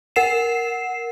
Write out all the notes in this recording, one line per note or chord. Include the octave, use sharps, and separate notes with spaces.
A#4 F#5 C7 E7